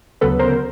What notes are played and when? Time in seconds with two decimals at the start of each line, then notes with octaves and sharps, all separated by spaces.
0.21 D2 C#3 F#3 B3 A4 B4
0.39 A#4 C5